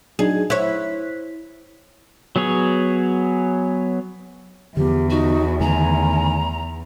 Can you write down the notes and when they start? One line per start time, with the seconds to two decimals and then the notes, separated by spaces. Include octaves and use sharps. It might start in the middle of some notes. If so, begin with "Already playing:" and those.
0.19 F#3 D4 D#4 G#4
0.50 E4 C5 C#5 F#6 B6
2.36 F#3 B3 G#4 C#5
4.77 E2 D3 F3 B3 G4
5.10 D#4 F#4
5.61 D3 D#3 A3 G#5 A#5